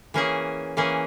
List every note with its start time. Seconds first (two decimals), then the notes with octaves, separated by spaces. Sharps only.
0.14 E3 A#3 C#4 G#4
0.77 E3 A#3 C#4 G#4